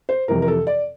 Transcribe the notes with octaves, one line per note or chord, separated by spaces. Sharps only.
C5
F2 C3 E3 A#4
A#4
A4
D5